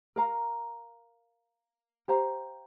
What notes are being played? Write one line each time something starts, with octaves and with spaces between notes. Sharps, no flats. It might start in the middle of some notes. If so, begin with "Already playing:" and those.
A#4 F5 A#5
G4 C5 F5 A#5